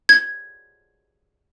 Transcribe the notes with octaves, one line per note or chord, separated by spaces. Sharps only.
G#6